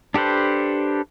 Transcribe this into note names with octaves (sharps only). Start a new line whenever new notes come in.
D4 G4 A4 B4 C5